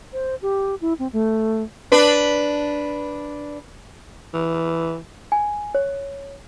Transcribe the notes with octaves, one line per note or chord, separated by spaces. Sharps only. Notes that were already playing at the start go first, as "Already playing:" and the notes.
C5
G4
E4
C4
A3
D4 B4
E3
G#5
C#5